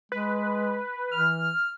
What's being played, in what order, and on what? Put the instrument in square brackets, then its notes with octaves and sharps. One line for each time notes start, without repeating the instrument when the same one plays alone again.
[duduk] G#3 [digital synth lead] B4
[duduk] E3 [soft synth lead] F6